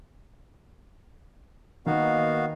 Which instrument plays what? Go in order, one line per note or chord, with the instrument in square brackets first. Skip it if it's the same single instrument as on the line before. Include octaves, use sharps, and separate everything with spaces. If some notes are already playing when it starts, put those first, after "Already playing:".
[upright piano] D#3 [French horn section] A#3 D#5 [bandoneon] B3 F#4 F5